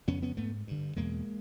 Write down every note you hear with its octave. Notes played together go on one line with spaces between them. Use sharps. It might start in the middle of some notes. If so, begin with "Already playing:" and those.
F2 C#3 B3 C#4
B3 C#4
G#2 A3 B3
G2 D3
E2 B2 G#3 A#3